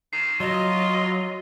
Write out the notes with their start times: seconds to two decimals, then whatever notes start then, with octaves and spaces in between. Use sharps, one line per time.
0.13 D#3 C7
0.40 F#3 F4 D#5